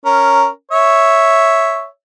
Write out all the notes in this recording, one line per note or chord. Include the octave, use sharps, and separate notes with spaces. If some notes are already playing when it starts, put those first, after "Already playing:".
C#4 A#4
C#5 E5